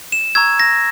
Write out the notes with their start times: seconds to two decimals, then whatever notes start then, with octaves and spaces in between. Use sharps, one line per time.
0.12 E7
0.35 A#5 C#6 E6 G#6
0.60 A#6